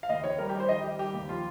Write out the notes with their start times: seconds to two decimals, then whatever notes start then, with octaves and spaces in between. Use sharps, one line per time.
0.03 F5
0.09 D#2 D#5
0.24 D#3 C#5
0.39 G3 A#4
0.49 G4
0.55 G3 C5
0.69 D#3 D#5
0.84 D#3 G4
0.99 G3 G4
1.13 D#2
1.28 F3 F4